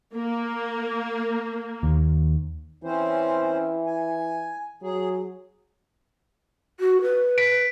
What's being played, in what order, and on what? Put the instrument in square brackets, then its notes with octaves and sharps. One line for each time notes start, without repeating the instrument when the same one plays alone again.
[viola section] A#3
[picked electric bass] D#2
[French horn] E3 [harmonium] C4 C#4 C5
[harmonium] G#5
[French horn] F#3 [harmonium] G#4
[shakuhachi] F#4
B4
[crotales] B6 D7